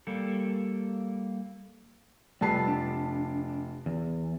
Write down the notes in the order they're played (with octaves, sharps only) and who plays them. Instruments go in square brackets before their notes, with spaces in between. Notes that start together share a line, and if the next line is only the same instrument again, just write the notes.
[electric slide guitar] G3 A#3 A4
[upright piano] F1 A5 C7 [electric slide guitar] G3 A4 B4
[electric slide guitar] D4
E2